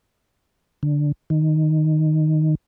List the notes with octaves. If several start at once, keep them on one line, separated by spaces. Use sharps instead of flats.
D3
D#3